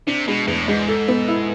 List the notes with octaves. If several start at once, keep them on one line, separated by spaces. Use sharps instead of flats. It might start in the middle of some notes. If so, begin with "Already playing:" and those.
C3 D4
B2 G#3
E2 A2
G#2 G#3
A4
B3
E4